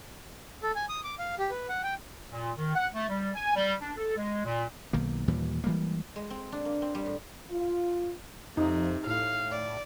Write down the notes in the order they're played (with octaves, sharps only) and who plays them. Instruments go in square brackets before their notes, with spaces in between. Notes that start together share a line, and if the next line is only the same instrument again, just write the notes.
[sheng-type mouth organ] A4
G#5
D#6
D6
F5
G4
B4
F#5
G5
[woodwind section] A#2
D#3
F#5
A3
G3
G#5
G3
D4
A4
G#3
A#2
[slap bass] B1 D#3 A#3
D#2 A#2 E3 G3
E3 G3 G#3 A#3
[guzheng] G#3
C4
D4
A#3
C4
G3
A2
[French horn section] F4
[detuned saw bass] F2 [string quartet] C3 [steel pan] D#4
[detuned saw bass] A2 [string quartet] F5
[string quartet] D5